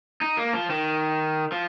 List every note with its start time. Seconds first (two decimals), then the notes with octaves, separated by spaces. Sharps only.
0.21 D#4
0.37 A#3
0.53 F3
0.70 D#3
1.52 F3